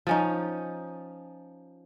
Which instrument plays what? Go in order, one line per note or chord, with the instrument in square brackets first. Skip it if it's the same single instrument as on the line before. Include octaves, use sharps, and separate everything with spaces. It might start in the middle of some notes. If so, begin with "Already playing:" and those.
[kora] F3 C#4 D#4